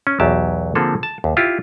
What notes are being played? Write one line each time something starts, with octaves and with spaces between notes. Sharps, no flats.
C#4
B1 E2 F#3 G4 A5
D3 F3 A#3 C4 G#4 A4
A5
D#2
E4 F4 G4